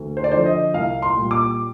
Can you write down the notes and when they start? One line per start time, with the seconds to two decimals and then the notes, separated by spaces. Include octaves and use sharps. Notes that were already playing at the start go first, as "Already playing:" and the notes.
Already playing: D2
0.17 C5
0.24 D5
0.31 D3 F3 C5
0.46 D#5
0.74 C2 F5
1.02 C6
1.17 A#2 G3
1.31 D6